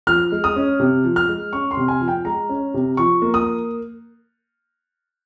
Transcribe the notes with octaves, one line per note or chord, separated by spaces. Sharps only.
F3 F6
G#3
D#6
C#4
C3
F3
F6
G#3
C#4 C#6
C6
C3
G#5
F3
G5
G#3 A#5
C#4
C3
F3 C#6
A#3
D#6